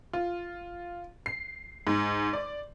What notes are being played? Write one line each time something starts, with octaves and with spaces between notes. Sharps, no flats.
F4
C7
G#2
D5